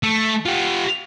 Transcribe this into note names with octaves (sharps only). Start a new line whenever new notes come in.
A3
F4 G4